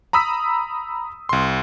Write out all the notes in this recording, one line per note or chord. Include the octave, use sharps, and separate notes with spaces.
A#5 B5 D#6 E6 B6
C2 C6